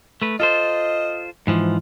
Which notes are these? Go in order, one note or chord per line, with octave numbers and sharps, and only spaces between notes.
A3 B4
F4 A4 C5 D#5
G#2 E3 F3